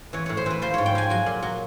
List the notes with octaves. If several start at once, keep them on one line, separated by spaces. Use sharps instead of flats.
E3 C#5
A2 C#5
C5
E3 B4
F3 C5
G#2 C#5
G5
F3 G#5
F#3 G#5
A#2
F#3